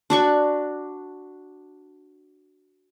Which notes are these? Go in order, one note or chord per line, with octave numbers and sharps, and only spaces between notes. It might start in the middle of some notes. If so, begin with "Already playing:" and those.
D4 F#4 C#6